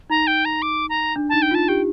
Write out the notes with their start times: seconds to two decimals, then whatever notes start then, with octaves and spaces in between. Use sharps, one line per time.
0.10 D#4 A#5
0.27 G5
0.45 A#5
0.62 D6
0.89 A#5
1.16 D4
1.29 D#4 A5
1.42 G5
1.51 F4
1.55 A5
1.68 G4 G5